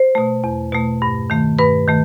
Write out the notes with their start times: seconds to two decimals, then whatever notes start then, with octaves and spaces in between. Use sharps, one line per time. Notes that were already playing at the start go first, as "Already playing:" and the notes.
Already playing: C5
0.15 B2 A3
0.44 E2
0.72 B2 A3
1.02 G2
1.30 D#3 A3
1.59 G2 B4
1.88 D#3 A3